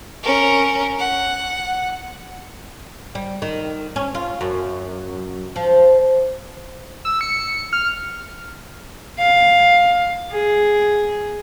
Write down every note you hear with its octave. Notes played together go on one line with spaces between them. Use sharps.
C#4 A#4
F#5
G3
D#3
C#4
F4
F#2
F3
E6
C#7
F6
F5
G#4